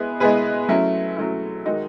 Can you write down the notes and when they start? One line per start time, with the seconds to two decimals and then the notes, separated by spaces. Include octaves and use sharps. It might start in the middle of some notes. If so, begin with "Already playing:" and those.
Already playing: G#3 B3 E4 G#4 B4
0.20 G#3 B3 E4 G#4 B4
0.69 F#3 A3 C#4 E4
1.17 F#3 A3 C#4 E4
1.65 D#3 G#3 D#4 F#4